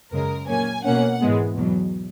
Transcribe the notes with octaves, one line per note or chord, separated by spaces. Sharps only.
F#2 C#3 G#3 A#4
A#2 F#3 A#3 C#4 G#5
B2 A#3 C#4 F#5
G#2 E3 G#3 B3
E2 B2 F#3